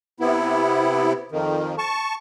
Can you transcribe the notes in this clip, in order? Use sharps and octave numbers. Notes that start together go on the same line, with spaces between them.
C3 B3 E4
F2 D#3
A5 C#6